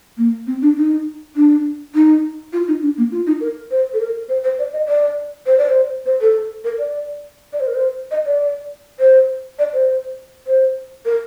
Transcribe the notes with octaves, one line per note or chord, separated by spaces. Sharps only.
A#3
C4
D4
D#4
D4
D#4
F4
D#4
D4
A#3
F4
D#4
A#4
C5
A4
A#4
C5
C5
D5
D#5
D5
C5
D5
C5
C5
A4
A#4
D5
D5
C5
A#4
C5
D#5
D5
C5
D5
C5
C5
A#4